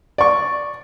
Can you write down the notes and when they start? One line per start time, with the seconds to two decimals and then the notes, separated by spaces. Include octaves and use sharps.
0.18 D5 C#6